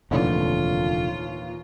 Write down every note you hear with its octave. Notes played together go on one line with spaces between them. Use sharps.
F1 D#2 A#2 D3 E3 F4